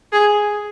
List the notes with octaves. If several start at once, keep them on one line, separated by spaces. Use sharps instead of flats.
G#4